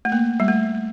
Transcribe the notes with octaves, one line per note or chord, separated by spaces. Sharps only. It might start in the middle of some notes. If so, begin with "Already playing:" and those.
A3
A#3
G3
A3